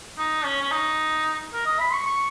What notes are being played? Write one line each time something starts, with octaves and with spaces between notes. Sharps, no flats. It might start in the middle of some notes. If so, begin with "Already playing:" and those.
D#4
C#4
C#4
D#4
A#4
D#5
B5
C#6
C#6